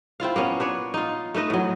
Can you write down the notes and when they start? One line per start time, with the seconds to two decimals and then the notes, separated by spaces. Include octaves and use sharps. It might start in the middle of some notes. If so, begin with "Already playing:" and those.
0.20 C4 E4 F4 F5
0.36 A#3 B3 C#4
0.60 D4 B4 C#5
0.94 D#4 F4
1.34 A3 D#4 B4 D#5
1.50 A2 F#3